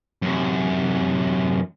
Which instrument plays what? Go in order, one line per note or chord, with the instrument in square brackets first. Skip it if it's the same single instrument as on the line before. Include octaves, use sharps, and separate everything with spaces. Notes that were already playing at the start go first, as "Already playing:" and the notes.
[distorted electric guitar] F#2 C3